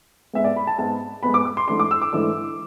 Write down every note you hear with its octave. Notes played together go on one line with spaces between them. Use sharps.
G#2 G#3 B3 E5
D5
B5
A5
G#2 G#3 B3 A5
G#2 G#3 B3 B5
D6
D6
C6
G#2 E3 A3 D4 C6
D6
E6
D6
G#2 E3 A3 D4